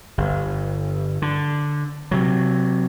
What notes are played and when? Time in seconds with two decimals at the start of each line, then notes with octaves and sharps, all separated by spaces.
0.18 G1
1.22 D3
2.11 C3 F#3